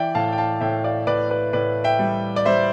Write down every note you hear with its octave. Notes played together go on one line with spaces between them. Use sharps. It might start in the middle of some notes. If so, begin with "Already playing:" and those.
Already playing: E3 D5 E5 G5
A2 F5 A5
G5
F5 A5
A2 E5 G5
D5 F5
A2 B4 D5
B4 D5
A2 B4 D5
E5 G5
G3
D5
G3 C5 E5